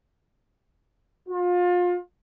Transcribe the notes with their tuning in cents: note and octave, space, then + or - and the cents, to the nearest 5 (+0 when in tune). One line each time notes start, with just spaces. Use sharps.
F4 +30